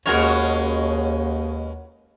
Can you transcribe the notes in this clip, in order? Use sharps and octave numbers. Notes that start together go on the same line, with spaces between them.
D#2 B2 G#3 C#4 F#4 A#4 C#5